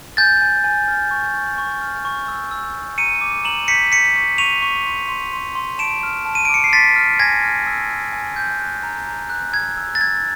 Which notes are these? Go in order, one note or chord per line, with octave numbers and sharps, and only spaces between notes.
G#5 G6 A6
G#5
G#5
F6
C#6
C#6
C#6
F6
C#6
E6
E6
E6
A#5 C#7 D#7
D6
A#5 E7 F#7
G6 B6 C#7
G6 B6 C#7
C#6
C#6 D#7 F7
C#6
C6
C6
C6
C6
A5 D7 E7
F6
A5
D#7
D7
D6 C#7
C7
C6 A6 B6
F6
G#5 G#6 A#6
F6
E6
E6
G#5
G6
F#6
A#5
A#5
F#6
E6 G#6
E6
A6
E6 G#6